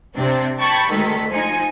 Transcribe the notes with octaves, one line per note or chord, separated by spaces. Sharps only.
C3 C4 D4
G5 A5 B5 C#6 G#6
D2 D#3 G#3 A4 B6
F3 D#4 G#5 C#7